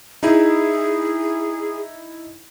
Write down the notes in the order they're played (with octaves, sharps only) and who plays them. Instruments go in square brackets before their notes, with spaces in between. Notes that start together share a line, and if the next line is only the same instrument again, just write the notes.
[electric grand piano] D#4 E4 [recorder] G#4